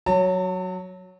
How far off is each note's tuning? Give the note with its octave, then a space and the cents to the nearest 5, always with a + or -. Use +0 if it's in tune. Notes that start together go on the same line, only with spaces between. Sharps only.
F#3 +0 A5 +40